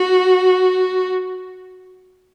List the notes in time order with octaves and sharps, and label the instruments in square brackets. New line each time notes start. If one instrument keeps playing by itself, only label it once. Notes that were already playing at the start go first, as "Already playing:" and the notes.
Already playing: [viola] F#4